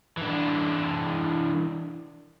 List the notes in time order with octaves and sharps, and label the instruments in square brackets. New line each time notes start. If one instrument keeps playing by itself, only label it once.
[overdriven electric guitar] E3 D4